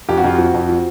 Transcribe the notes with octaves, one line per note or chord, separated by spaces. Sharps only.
F2 G4
F#4
F2 F4
F3 F#4
F2
F3